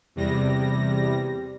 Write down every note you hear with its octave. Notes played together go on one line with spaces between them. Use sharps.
E2 C3 G3 A#6